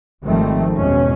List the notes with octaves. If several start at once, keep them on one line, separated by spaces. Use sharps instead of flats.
G#1 D#3 F3 G3 A3 C4
E2 G#2 B2 C#4